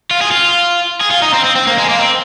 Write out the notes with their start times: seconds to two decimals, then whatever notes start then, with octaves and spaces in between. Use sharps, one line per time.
0.11 F4
0.22 G#4
0.31 F4
1.01 G#4
1.11 F4
1.22 D#4
1.34 C4
1.44 C4
1.56 C4
1.67 A#3
1.78 G#3
1.89 A#3
1.99 C4